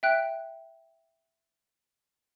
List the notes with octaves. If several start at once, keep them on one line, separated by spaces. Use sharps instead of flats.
E5 G5 F#6